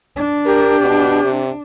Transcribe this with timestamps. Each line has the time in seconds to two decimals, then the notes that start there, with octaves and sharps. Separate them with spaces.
0.16 D4
0.46 G4 A#4
0.80 B2
1.24 C3